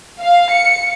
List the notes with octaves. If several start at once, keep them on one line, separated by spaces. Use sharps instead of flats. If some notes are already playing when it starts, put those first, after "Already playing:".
F5
C#7